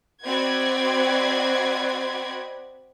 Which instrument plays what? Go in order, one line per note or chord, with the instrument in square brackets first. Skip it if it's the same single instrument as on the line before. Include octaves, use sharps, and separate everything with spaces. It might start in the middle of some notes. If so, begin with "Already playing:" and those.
[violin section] C4 F#4 D5 D#5 B5 G#6